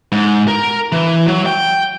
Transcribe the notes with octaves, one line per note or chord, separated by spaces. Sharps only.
G#2
A#4
E3
F#3
G5